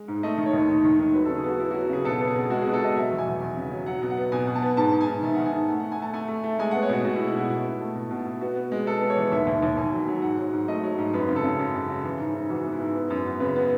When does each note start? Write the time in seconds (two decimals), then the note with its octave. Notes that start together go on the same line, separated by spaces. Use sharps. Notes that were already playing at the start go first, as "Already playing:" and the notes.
Already playing: G#3
0.08 G#2
0.23 A3 D#5
0.38 D#3
0.46 C#5
0.53 D#2
0.69 D#3
0.84 D#3
0.99 D#3
1.14 F#3 B4
1.25 A4
1.29 C#3
1.37 G#4
1.44 B3 F#4
1.60 B3 E4
1.71 F#4
1.75 F#3
1.90 C#3 G#4
2.05 B2 A4
2.20 B3
2.27 G#4
2.35 B2
2.50 G#3 F#4
2.62 G#4
2.66 B2
2.73 A4
2.81 B2 D#5
2.95 F#3 E5
3.11 E2
3.18 G#5
3.26 E2
3.41 E2
3.57 C#3
3.72 F#3
3.86 F#3 F#5
4.02 B2
4.10 F#5
4.17 B3
4.32 B2 G#5
4.47 B2
4.55 A5
4.62 B3
4.77 G#2 A5
4.92 G#2
5.01 G#5
5.07 G#2
5.23 D#3 E5
5.35 F#5
5.38 D#3
5.46 G#5
5.53 G#2 F#5
5.69 A3
5.79 F#5
5.84 A3
5.92 G#5
5.99 A3 A5
6.13 A3 G#5
6.28 A3
6.44 A3
6.59 G#3 G#5
6.71 F#5
6.75 B3
6.82 C#5
6.89 B2 F#4
7.04 B2 F#4
7.16 E4
7.20 G#3
7.27 E4
7.35 B2 F#4
7.49 B2 E4
7.65 B2
7.80 A3
7.95 B2
8.11 B2
8.26 B2
8.41 B3 F#4
8.56 B3
8.72 G#3
8.86 B3 A4
9.01 B3
9.10 C#5
9.17 E3
9.32 D#2 E5
9.47 D#2
9.62 D#2
9.77 D#2 G#5
9.92 F#3
10.08 F#3
10.22 G#2 F#5
10.38 F#3
10.53 G#2
10.68 A3 D#5
10.84 F#3
10.98 G#2
11.13 F#2 B4
11.28 C#3
11.36 A4
11.44 C#3
11.59 F#2
11.74 C#3
11.90 C#3
12.04 E3
12.20 G#2
12.34 G#2
12.49 E3 F#4
12.65 B3
12.73 E4
12.80 G#2
12.95 B3
13.10 F#2
13.26 B3
13.40 C#3 B4
13.56 B3